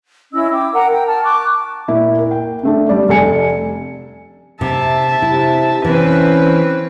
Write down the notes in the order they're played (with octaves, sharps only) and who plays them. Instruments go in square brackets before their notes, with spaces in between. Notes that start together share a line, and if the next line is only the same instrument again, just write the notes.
[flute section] C#4 E4 D#5 E6
G5 D6
A#4 F#5 A#5
G5
A5 F6
C#6 D6 F#6
[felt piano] A#2 E4
A#4
G5
C#3 A3 D4
G3 D5
F1 A4 G#5 C#7
[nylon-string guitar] C3 [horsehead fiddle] E5 A5
[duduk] C3 [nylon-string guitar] E4
[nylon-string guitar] E3 [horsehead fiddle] C4 B4 [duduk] C#4